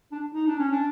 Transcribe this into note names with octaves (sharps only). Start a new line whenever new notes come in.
D4
D#4
D4
C#4
D4